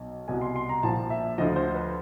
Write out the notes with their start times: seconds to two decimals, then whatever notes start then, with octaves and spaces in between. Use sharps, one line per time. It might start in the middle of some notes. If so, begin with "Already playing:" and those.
Already playing: B1
0.28 C2 B2 G#5
0.41 C6
0.56 C6
0.69 A#5
0.83 A#1 A#2 F3 A5
1.10 E5
1.38 D2 D3 F3 D#5
1.56 C5
1.74 B4